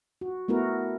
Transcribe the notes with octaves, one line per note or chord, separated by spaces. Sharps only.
F#4
A3 B3 E4 F#4 A#4